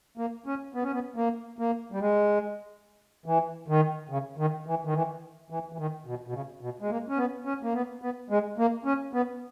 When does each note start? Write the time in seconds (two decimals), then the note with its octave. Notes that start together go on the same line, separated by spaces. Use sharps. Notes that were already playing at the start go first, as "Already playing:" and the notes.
0.18 A#3
0.46 C#4
0.74 B3
0.83 C#4
0.92 B3
1.16 A#3
1.59 A#3
1.92 G3
2.01 G#3
3.26 E3
3.68 D#3
4.10 C#3
4.38 D#3
4.66 E3
4.85 D#3
4.94 E3
5.50 E3
5.73 E3
5.78 D#3
6.06 B2
6.27 B2
6.33 C#3
6.61 B2
6.81 G#3
6.89 A#3
7.09 C#4
7.17 B3
7.45 C#4
7.63 A#3
7.74 B3
8.02 B3
8.30 G#3
8.58 A#3
8.85 C#4
9.13 B3